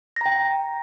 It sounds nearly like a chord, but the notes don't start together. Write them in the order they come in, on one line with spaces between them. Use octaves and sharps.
A#6 A#5 G5